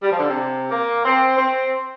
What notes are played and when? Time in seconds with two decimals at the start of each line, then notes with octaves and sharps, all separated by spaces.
0.02 G3
0.11 F3
0.19 D3
0.28 C3
0.70 A#3
1.04 C4
1.38 C4